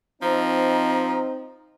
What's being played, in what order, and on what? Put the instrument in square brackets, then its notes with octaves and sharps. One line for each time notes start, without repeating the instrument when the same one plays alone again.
[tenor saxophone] F3 [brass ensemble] C4 D#4 [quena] A#5